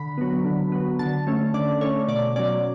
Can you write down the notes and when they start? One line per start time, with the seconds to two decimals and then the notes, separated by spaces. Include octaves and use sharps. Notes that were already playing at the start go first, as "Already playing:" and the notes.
Already playing: D3 B5
0.18 F#3 B3
0.45 D3
0.72 F#3 B3
0.99 D3 A5
1.27 A3 C#4
1.54 D3 D5
1.81 A3 C#4 C#5
2.08 B2 D5
2.36 F#3 C#4 D5